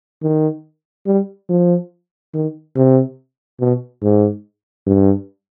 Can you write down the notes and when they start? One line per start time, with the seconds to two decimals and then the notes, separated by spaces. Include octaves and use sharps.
0.23 D#3
1.07 G3
1.50 F3
2.34 D#3
2.76 C3
3.60 B2
4.03 G#2
4.87 G2